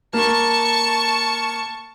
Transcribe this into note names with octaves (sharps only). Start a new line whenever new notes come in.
A#3 A5 C#6